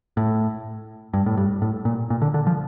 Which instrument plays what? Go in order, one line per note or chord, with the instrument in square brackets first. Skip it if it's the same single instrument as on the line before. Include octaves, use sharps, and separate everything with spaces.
[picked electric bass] A2
G2
A2
G2
A2
A#2
A#2
D3
D3
F3